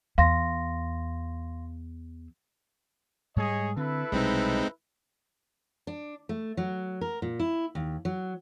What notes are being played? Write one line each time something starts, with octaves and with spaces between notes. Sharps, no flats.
E2 F5 C6 A#6
G#2 G3 G#3 G#4 C#5 D#5
D3 C4 E4 A4 B4
B1 C3 G3 G#3 C4 D#4
D4
A3
F#3
A#4
A#2
E4
D#2
F#3